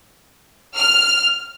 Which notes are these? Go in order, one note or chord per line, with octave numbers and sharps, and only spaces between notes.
F6